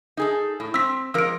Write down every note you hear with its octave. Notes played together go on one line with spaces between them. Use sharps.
D#4 G#4 A4
A2
C4 E6 B6
F3 G#3 A#4 E6 D7